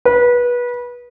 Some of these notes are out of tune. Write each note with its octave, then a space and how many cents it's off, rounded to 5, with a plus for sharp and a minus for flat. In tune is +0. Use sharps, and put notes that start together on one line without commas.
B4 -25